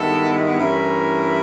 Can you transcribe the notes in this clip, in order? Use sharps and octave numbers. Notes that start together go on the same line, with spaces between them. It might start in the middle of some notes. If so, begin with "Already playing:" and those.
Already playing: G2 D#3 G#3 B3 E4 A4
G2 E3 A3 C#4 E4 A#4